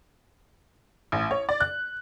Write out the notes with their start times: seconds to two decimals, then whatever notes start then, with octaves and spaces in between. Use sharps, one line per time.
1.12 A1
1.31 C#5
1.49 D5
1.61 F#6